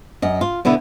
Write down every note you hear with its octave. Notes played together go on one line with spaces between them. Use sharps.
F#2 D#5
F4
B2 D3 B3 E4